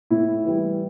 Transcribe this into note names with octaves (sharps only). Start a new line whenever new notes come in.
A2 E4
E3 G3